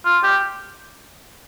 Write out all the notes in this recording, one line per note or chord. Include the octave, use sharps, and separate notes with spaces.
F4
G4